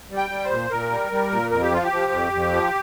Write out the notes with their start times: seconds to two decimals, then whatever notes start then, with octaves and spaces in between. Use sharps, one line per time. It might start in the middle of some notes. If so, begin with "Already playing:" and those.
0.11 G3
0.17 G5
0.30 G3
0.44 C5
0.51 A#2
0.71 A#2 A#4
0.91 G3
1.12 G3
1.31 A#2
1.51 F2 A#4
1.62 G4
1.71 F3 F4
1.84 G4
1.92 F3
2.12 F2
2.32 F2
2.52 F3